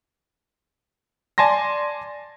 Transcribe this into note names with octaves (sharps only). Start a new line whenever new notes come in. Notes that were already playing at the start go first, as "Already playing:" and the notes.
D5 G#5 A5 C6 A#6